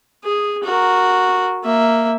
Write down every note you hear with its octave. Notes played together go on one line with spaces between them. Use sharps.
G#4
F#4 A#4
A#3 E5